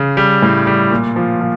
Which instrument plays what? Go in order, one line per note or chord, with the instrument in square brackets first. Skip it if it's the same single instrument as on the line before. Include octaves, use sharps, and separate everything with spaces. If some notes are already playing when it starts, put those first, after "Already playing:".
Already playing: [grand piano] C#3
G3
A2
G3
A#2
F3
F3